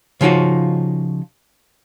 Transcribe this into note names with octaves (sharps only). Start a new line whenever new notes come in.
C#3 F3 D#4 F4 F#4